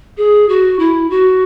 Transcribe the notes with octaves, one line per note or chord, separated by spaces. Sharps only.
G#4
F#4
E4
F#4